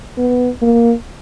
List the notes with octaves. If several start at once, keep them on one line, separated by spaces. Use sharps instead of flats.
B3
A#3